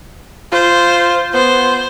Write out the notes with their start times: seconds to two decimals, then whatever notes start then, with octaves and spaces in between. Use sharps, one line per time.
0.52 F4 C5
1.34 B3 C5